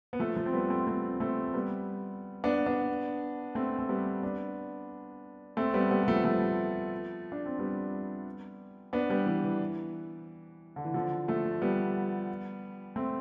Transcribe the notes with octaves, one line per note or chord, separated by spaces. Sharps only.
B3
F3 A3
F3 A3
C4
G3 B3
A3 C4
A3 C4
A3 C4
G3 B3
B3 D4
B3 D4
A3 C4
A3
G3 B3
B3 D4
A3 C4
G3 B3
G3 B3
G3
F3 A3
F3 A3
D4
C4
G3 B3
B3 D4
G3 B3
E3
E3
D3
E3
D3 F3
F3 A3
G3 B3
A3 C4